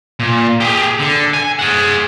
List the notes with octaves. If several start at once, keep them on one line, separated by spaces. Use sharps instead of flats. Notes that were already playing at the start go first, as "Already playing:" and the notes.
A#2
G4 G#4
D3
G#5
G#4 F#5